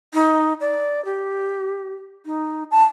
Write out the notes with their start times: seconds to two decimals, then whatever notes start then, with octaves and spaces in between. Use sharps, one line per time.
0.14 D#4
0.61 D5
1.05 G4
2.26 D#4
2.71 A5